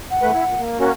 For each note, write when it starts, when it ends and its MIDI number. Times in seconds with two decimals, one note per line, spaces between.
0.11 0.61 78
0.22 0.32 40
0.22 0.32 57
0.22 0.32 71
0.33 0.44 64
0.45 0.55 46
0.58 0.78 58
0.79 0.92 58
0.79 0.92 61
0.79 0.92 66
0.79 0.90 70